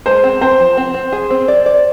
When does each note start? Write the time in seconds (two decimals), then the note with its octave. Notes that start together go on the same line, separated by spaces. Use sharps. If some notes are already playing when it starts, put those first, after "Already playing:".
0.06 G#3 C5
0.24 C4
0.41 C4 C5
0.59 F3
0.77 C4
0.94 C4
1.13 G#4
1.30 C4
1.48 D5
1.66 D5